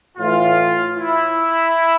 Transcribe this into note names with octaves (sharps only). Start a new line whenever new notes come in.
A2 E3 F4
E4